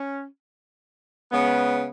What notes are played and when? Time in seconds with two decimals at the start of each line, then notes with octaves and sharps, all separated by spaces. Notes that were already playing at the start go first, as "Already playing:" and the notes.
Already playing: C#4
1.31 C#3 G#3 B3